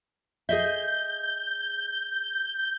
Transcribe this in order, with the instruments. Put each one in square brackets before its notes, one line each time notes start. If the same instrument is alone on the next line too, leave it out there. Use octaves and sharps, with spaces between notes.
[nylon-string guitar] G#4 D#5 E5 [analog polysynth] G6